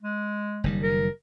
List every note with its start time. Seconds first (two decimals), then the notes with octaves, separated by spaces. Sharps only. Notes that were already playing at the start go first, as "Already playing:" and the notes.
0.03 G#3
0.64 F#1 D#3 G3
0.83 A#4